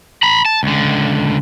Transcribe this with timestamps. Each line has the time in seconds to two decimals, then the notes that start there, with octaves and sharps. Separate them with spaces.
0.23 A#5 B5
0.45 A5
0.63 C#2 D3